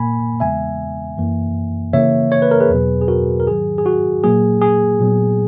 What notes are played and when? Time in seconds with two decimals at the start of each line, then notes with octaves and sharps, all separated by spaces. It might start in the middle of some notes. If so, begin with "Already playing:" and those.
Already playing: A#2 A#3 G#5 B5
0.40 E2 C#3 E3 G#3 B3 E5 G#5
1.17 F#2 E3 A#3
1.93 C#3 E3 A#3 C#5 E5
2.32 C#5
2.42 B4
2.51 A#4
2.60 G#4 B4
2.70 E2 B2 F#3 B3
3.01 G#4
3.08 F#4 A#4
3.40 A#4
3.46 G#2 D#3 F#3 G#4
3.78 G#4
3.86 F#4
4.24 A#2 F#3 A#3 G#4
4.62 G#4
5.00 A#2 F#3 B3